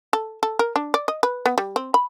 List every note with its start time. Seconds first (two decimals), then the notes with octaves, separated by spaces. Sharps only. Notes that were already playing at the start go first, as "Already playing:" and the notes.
0.13 A4
0.43 A4
0.59 A#4
0.76 D4
0.94 D5
1.08 D#5
1.23 B4
1.46 B3
1.58 G3
1.76 C4
1.94 B5